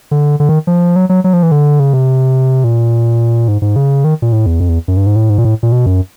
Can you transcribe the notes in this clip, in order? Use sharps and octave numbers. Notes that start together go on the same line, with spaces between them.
D3
D3
D#3
F3
F#3
F#3
F#3
F3
E3
D3
C#3
C3
A#2
G#2
G#2
C#3
D#3
A#2
A2
E2
F2
E2
F#2
G2
G#2
A2
G#2
A#2
A2
A#2
B2
F#2